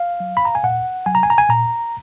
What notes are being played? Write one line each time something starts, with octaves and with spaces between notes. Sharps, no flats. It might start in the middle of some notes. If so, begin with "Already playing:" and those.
Already playing: F5
F#3
B5
A#5
G#5
A#2 F#5
F#3 G#5
A#5
G#5
A#5
G#5
A#2 A#5